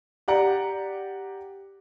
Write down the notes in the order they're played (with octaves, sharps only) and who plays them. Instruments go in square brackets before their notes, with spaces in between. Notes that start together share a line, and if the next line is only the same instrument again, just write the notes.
[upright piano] G4 D5 F#5 A#5